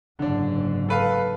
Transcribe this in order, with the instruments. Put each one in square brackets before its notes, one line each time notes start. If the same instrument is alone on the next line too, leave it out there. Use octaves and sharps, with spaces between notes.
[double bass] F#1 G#2 [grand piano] D3 D4
[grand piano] A4 B4 F5